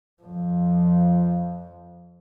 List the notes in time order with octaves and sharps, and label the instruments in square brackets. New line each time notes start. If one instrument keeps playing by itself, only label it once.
[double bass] F2 F3